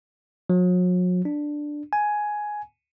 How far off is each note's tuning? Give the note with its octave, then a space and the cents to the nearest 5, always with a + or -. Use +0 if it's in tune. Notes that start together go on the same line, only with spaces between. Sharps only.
F#3 -40
D4 +5
G#5 +10